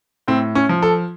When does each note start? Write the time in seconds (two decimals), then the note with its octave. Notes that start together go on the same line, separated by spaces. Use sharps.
0.28 A2 C4
0.55 C#4
0.69 F3
0.83 A4